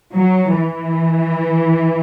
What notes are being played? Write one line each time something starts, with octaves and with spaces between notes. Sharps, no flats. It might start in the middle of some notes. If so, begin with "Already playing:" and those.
F#3
E3